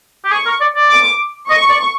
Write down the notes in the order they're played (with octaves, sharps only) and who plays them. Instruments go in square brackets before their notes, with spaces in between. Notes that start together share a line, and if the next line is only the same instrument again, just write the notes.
[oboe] G4
[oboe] G#4 [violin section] C#6
[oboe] A#4
D5
D5
[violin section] D6
[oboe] D#5 [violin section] C#6
[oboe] D5